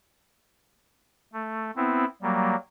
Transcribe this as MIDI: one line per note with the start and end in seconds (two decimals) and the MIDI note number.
1.33 1.71 57
1.76 2.05 59
1.76 2.05 60
1.76 2.05 64
2.22 2.55 54
2.22 2.55 55
2.22 2.55 58